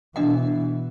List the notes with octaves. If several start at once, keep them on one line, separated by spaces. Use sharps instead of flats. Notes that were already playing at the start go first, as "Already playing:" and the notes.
B2 E3 D4 D#5 F#5